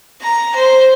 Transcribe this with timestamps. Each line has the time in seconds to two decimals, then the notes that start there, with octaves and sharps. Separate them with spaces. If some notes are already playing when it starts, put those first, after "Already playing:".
0.21 A#5
0.55 C5